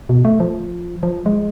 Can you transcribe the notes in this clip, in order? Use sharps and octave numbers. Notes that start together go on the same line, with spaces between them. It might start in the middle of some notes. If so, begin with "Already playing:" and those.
B2
A3
F3
F3
G#3